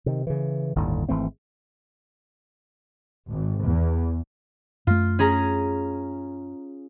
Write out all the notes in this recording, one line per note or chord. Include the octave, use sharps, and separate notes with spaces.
C3 D#3
C#3 E3
G1 D#2 A2 D3
G#1 E3 A3 C4
G#1
E2
F#2 A3 F4
C#4 G#4 A#5